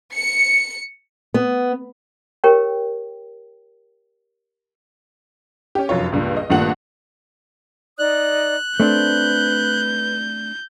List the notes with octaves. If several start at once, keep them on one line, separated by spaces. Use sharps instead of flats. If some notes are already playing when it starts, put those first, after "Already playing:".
C#7
B3
G4 A#4 C#5 G5
C#4 G4
F1 F#2 F4 C#5
C#2 G2 A#2
D#5
G#1 G2 A#2 A3 F#5 F#7
D#4 D5 D#6 F#6
A3 C4 D4 B4 G6